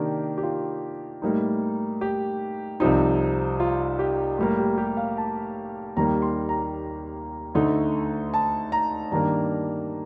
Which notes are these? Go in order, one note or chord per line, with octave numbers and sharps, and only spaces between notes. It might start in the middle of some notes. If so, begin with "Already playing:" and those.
Already playing: C3 D#3 A#3 D4 G4
G4
F4
A2 G3 A#3 D#4
G4
C2 C3 F3 C4 D#4
F4
G4
A2 G3 A#3
G4
G4
F5
A5
D#2 D#3 G3 A#3 A#5
C6
A#5
D2 D3 A3 D#4
A5
A#5
G2 D#3 A#3 D4 A#5